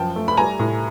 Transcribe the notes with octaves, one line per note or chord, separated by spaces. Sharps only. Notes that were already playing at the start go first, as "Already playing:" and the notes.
Already playing: F#2 F3 G5 A5
A3
B5
G3 G#5 A#5
A2